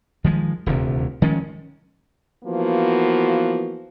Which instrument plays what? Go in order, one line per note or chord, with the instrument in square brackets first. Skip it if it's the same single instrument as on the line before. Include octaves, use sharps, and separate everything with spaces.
[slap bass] D#3 F3 G#3
D#1 D2 C3
D#3 F3 G#3 C#4
[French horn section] E3 F3 A#3 B3 F#4